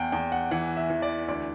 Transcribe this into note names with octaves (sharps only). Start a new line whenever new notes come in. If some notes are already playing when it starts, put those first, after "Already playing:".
Already playing: E2 F#5 G5
E2 G5
F#5
E3 F#5
E5
E3
D5
D2 D5